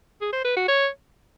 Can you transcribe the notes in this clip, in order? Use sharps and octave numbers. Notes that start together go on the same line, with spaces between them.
G#4
C5
B4
F#4
C#5